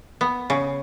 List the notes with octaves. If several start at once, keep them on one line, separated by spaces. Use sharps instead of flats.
B3
C#3